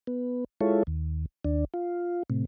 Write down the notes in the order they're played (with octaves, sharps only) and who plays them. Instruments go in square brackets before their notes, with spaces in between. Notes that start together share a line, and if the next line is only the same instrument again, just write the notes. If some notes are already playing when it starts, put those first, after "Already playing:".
[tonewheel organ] B3
G#3 E4 F4 A4 C#5
D#2
D#2 D4
F4
A2 C3